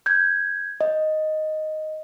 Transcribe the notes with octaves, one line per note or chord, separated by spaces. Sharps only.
G6 G#6
D#5